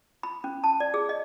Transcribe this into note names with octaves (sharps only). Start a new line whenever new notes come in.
B5
C#4
A5
D5
G#4
D#5